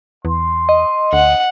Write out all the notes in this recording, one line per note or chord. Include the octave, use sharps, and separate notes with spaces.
E2 C6
D#5
D2 F#5